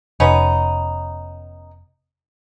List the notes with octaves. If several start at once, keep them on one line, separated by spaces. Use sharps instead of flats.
F1 B3 C#4 D#4